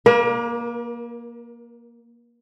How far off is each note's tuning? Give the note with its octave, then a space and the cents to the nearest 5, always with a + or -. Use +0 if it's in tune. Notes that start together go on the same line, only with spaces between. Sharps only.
A#3 +15 A#4 +45